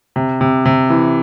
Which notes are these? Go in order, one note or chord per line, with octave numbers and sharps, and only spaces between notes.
C3
C3
C3
E3